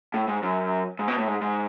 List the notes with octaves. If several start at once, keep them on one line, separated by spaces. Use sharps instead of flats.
A2
G#2
F#2
G#2
B2
A2
G#2
G#2